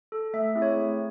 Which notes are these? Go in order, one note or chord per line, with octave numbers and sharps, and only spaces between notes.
A4
A3 E5
C4 E4 G#4
C#5
A3